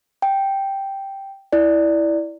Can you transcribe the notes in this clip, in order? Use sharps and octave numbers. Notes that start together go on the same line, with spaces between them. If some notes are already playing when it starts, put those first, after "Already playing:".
G5
E4 D5